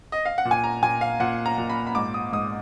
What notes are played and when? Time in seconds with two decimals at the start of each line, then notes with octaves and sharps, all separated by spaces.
0.12 D#5
0.25 F5
0.38 F#5
0.45 A#2
0.51 G#5
0.64 A#5
0.82 A#2 G#5
1.01 F5
1.20 A#2 F#5
1.46 A#5
1.58 A#2
1.70 B5
1.87 B5
1.95 G#2 D6
2.14 D#6
2.32 G#2 D#6